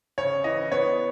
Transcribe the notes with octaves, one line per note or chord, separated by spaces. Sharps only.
C#3 C#5
E3 D#5
B3 C#5